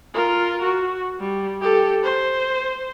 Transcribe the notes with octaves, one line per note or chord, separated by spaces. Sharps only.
F4 A#4
F#4
G3
G4 A4
C5